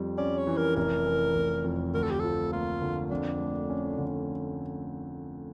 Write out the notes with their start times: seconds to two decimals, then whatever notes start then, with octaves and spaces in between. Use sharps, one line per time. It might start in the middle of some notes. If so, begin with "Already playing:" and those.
Already playing: F2 G3
0.18 C#4 D5
0.38 C#5
0.47 E3
0.57 A#4
0.76 F1 A#4
1.05 E3
1.35 F1
1.64 F2
1.94 D2 A#4
2.03 A4
2.11 G4
2.20 F3 A4
2.52 A#3 F4
2.82 D3
3.11 F2 D4
3.40 A3
3.70 C#4
3.98 D3